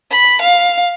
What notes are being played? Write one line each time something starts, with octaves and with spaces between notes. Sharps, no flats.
B5
F5